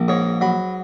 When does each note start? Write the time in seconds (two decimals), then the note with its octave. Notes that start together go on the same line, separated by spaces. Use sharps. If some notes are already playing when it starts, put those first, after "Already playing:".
Already playing: A#1
0.08 G#2 C#5
0.41 F#3 B5